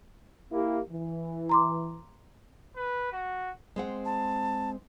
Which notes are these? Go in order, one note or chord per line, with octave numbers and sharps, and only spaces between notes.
A#3 E4 G4
E3
A#5 C6 D6
B4
F#4
G#3 C4 F#5
A5